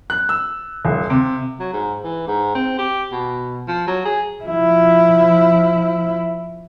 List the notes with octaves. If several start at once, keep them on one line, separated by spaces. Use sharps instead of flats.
F#6
E6
D#1
C3
F#3
G#2
E3
G#2
C4
G4
B2
F3
F#3
G#4
F3 E4